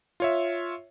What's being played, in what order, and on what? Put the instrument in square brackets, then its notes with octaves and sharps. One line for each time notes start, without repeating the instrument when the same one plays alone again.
[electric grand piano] F4 C#5 E5